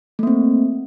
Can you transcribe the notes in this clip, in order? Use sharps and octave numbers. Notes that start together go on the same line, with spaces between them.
A3 A#3 C4